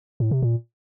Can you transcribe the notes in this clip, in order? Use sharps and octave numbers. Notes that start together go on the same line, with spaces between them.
A2
C3
A#2